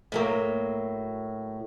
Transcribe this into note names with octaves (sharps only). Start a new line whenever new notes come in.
A2 F#3 A#3